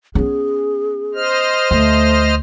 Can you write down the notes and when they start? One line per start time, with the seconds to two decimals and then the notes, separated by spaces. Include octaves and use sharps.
0.15 B3 C#4 G#4
1.15 C5 D#5 F6
1.71 D2 A3